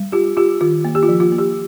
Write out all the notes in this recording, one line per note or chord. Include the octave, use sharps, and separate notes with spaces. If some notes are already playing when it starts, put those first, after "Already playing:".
Already playing: G3
F4 G4
F4 G4
D#3 F4
A#3
G4
F4
F3
F4
A#3
G4